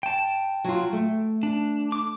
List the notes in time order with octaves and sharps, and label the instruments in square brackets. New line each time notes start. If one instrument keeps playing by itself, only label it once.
[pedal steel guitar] G5 A5
[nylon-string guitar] F#3 F4
A3
[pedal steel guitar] D4
D6